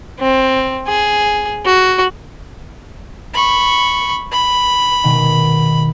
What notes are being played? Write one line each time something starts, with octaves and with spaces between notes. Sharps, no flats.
C4
G#4
F#4
B5 C#6
B5
B2 D#3 G#3